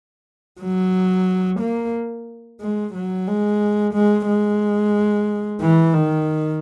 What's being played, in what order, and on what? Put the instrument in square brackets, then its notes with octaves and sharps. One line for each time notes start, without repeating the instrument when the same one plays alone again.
[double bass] F#3
A#3
G#3
F#3
G#3
G#3
G#3
E3
D#3